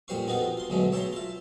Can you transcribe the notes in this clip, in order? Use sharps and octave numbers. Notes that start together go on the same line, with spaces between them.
F2 A#2 G3 C5 F5 C#6
B3 C4 D#4 F4 F#4 A4
F4 C6
D2 B2 F#3 G#3 A3
C#5 E5 G5 A5 A#5 C6
F4 E5